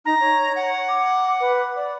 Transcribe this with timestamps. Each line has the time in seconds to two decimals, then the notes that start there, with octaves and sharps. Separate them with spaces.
0.05 D#4 A#5
0.20 C#5
0.56 F#5
0.89 D6
1.40 B4
1.76 D5